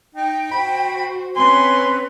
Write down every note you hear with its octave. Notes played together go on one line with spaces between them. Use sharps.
D#4 G5
F#4 C5 B5
C4 C#4 B4 C#5 G#5 C6